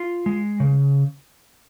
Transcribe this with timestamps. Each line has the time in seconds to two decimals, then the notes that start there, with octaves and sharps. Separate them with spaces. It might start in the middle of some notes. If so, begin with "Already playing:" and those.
Already playing: F4
0.26 G#3
0.60 C#3